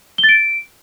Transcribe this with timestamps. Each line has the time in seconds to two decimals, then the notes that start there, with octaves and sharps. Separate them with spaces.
0.18 G7
0.24 A6
0.29 D7